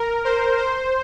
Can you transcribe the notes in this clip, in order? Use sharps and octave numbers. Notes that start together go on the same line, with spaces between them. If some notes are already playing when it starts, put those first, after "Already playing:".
Already playing: A#4
C5
C5